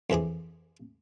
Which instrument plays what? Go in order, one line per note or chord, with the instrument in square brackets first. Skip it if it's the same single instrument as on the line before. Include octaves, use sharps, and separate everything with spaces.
[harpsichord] F2 E3 G#4 D6